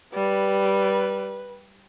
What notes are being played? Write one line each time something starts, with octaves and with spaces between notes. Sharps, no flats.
G3 B4